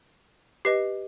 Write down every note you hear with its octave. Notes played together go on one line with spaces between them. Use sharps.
G4 B4 D#5 C7